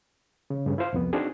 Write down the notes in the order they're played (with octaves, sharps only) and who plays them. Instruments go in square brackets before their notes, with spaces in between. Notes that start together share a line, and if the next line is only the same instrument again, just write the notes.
[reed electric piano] C#3
G2 C#3
E4 F4 C5 F5
C2 F2 B3
C4 D4 D#4 F#4 G#4